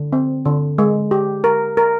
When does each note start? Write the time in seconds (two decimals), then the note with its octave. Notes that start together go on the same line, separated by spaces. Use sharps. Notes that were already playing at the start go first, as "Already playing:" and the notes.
Already playing: D3
0.13 C4
0.45 D3
0.78 G#3
1.11 G4
1.44 A#4
1.77 A#4